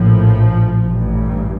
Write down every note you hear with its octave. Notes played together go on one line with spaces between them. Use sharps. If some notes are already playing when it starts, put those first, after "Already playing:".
Already playing: A#1 A2 F3
A1 G2